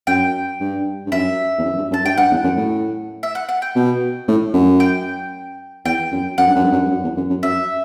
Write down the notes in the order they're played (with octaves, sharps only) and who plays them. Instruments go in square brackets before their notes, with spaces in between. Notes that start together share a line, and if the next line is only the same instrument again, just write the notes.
[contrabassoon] F#2 [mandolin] G5
[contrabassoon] G2
G2
[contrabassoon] F#2 [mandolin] E5
[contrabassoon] E2
F#2
G2
F#2
[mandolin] A5
[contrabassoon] G2 [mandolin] G5
[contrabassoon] G2 [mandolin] F#5
[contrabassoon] E2
F#2
A2
[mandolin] E5
F#5
F#5
G5
[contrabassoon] B2
A2
F#2
[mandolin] G5
[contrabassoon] E2 [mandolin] G5
[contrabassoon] F#2
[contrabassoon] F#2 [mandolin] F#5
[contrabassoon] G2
F#2
G2
F#2
G2
F#2
E2
F#2
F#2
[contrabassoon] F#2 [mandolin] E5